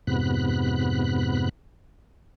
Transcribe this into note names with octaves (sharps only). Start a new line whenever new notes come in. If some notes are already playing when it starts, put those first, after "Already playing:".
F2 G#2 C3 B3 B5 F#6